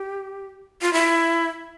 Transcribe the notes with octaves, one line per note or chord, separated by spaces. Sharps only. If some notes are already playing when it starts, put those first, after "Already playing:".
Already playing: G4
F4
E4